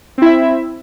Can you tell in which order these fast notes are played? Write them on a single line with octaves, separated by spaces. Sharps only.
C4 E4 E5